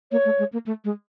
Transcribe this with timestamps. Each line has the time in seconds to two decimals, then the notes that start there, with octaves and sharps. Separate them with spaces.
0.12 A#3 C#5
0.25 A3
0.39 G#3
0.53 A#3
0.66 A3
0.84 G#3